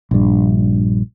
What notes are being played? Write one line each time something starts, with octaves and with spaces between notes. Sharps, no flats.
A#1 G2